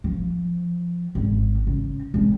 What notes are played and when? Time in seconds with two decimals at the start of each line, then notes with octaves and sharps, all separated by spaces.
0.04 F3
1.15 G#1
1.67 C#3
2.14 G#1